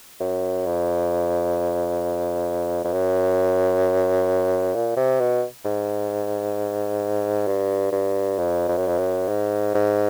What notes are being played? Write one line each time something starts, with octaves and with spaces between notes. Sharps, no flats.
F#2
F2
F2
F#2
A#2
C3
B2
G#2
G2
G2
F2
F2
F#2
F2
F#2
G#2
G#2